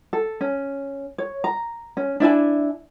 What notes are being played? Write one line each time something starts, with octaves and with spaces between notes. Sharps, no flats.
A4
C#4
C#5
A#5
C#4
D4 E4 E5 G#5